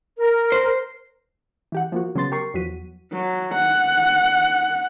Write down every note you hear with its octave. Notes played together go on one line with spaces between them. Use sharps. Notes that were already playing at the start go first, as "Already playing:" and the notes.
A#4
C5
E3 G4 F#5
F3 A#3 F#4
C#3 F#3 B3 C6 A6
G4 A#4 C#6 C7
E2 F3 F#3 F#4 B6 D#7
F#3
F#5